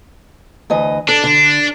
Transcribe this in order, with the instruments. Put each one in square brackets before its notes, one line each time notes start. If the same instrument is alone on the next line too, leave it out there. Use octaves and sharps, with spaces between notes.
[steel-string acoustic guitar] D2 E3 D#5
[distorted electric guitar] D4 [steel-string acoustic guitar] A4
[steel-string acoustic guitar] D3